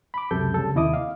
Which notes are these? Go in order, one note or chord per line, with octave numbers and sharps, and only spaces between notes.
B5 D6
C#2 F#2 C3 A4 G6
C#3 G3 A4
D#2 C3 E4 D#5 D6 D#6
F5